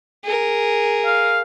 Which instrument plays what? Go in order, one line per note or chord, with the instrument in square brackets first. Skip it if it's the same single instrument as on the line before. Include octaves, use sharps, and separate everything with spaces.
[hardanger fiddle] G#4 A#4
[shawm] F5